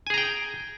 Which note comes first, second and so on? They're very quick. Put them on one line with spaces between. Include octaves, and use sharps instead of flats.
G#5 G#4 A#5 G5